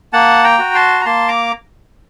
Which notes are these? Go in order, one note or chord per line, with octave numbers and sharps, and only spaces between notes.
A#3 F#5 A5
G5 A#5
F#4
A5 C6
A#5
A#3 A5 C6
A#5 D6